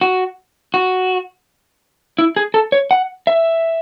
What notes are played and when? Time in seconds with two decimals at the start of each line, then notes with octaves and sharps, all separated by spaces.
0.01 F#4
0.74 F#4
2.19 E4
2.36 G#4
2.54 A4
2.72 C#5
2.91 F#5
3.27 E5